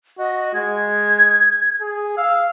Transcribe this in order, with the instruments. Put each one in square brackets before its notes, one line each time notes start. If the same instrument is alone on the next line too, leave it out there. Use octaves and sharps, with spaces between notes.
[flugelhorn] F#4 [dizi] D#5
[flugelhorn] G#3 [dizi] G#6
[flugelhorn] G#4
[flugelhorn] F5 [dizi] E6